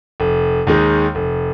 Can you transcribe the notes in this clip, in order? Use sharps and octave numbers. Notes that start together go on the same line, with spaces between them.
F1
D#2 D#3 G#3
F1